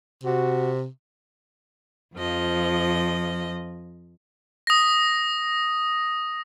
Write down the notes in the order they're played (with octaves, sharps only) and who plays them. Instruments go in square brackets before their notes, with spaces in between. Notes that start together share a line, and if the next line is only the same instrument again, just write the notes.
[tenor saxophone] C3 [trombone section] F#4
[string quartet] F2 F3 D#5
[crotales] D#6 A#6